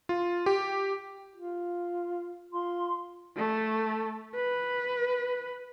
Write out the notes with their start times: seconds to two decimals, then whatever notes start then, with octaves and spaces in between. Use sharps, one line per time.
0.09 F4
0.46 G4
1.36 F4
2.53 F4 C6
3.36 A3
4.35 B4